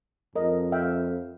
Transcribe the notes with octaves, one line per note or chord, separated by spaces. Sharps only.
F2 A#4 D#5
E5 F5 G5